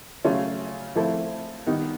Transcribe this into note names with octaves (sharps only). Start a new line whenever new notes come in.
C#3 F#3 A3 C#4 F4
F3 A3 C4 E4 A4
D#3 G3 B3 D#4